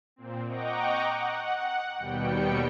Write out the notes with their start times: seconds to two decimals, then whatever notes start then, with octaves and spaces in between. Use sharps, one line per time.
0.16 A#2 C4
0.46 D#5 F#5 G5 A#5 C#6 D6
1.12 F#5
1.98 D#2 B2 G3 G5 C#7